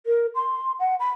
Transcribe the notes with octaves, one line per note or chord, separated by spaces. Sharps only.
A#4
C6
F#5
B5